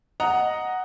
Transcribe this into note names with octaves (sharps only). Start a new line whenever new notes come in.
D#5 F#5 A#5